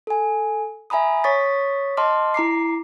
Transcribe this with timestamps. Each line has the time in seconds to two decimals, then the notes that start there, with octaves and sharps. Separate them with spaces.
0.07 A4 G#5
0.90 E5 G#5 A#5 B5 D#6
1.24 C#5 C#6 D#6 A6 B6
1.97 D#5 A5 C6 D6 F6
2.34 E4 A#5 D6 C7